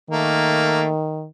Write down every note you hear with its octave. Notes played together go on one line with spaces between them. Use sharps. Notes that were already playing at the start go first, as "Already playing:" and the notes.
D#3 A3 A#3